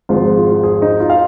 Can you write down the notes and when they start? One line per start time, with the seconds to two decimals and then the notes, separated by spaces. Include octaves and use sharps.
0.09 G#1 G#2 F3 G#3 F4
0.23 G#4
0.36 F4
0.50 F4
0.63 G#4
0.82 D#4
1.00 F4
1.10 F5